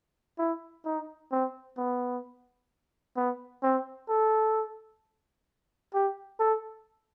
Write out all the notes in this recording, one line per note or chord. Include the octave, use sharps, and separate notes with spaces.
E4
D#4
C4
B3
B3
C4
A4
G4
A4